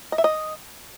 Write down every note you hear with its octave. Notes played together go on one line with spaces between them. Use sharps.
D#5
E5
D#5